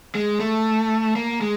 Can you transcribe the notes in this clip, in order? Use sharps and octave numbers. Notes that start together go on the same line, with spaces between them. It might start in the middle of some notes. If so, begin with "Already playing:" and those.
G#3
A3
A#3
G#3